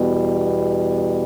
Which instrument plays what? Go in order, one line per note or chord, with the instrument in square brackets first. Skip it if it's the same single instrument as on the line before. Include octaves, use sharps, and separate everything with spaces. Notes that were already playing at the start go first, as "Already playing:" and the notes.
Already playing: [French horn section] E2 B2 G3